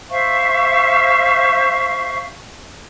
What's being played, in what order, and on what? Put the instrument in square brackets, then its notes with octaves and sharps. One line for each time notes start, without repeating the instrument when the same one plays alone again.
[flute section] C5 E5 F5 C#6